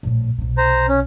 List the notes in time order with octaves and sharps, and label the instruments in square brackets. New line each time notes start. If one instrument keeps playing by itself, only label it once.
[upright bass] A#1 A2
B1 C3
[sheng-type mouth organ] C5 A#5
C#4